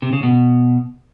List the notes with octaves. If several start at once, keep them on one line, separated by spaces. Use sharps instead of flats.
C3
C#3
B2